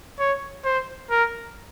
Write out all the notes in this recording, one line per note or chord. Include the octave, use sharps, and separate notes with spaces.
C#5
C5
A#4